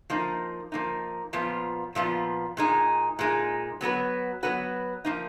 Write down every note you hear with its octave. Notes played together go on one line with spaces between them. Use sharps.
F3 A#3 D#4
F3 A#3 D#4
A#2 F3 B3 F4
A#2 F3 B3 F4
A#2 G#3 D#4
A#2 G#3 D#4
F#3 B3 F#4 B4
F#3 B3 F#4 B4
F3 A#3 D#4